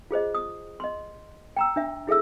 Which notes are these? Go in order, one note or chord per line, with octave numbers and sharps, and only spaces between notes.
F4 G#4 C5 D#5
D#6
D#5 C6
G5 A#5 E6
D4 E5
E4 G#4 A4 E5 E6